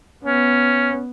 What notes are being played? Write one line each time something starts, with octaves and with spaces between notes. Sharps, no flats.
B3 C#4